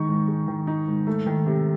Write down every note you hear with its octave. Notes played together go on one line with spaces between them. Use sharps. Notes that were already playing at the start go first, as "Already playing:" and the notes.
Already playing: D#3 G#3 D#4 C#6
G#2
G#3
D#3
D#4
G#2
A3
D#3
C3